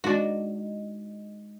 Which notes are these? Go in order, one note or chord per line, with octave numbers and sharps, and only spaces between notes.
G#3 D4 D#4 F#4